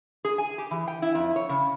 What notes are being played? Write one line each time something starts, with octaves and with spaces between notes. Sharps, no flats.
G#4
G#5
G4
E3
G5
E4
F2
C#5
C#3